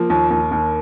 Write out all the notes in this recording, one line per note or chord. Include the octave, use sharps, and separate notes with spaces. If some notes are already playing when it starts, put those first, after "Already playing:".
Already playing: F3 A#3
D#2
D#2
D#2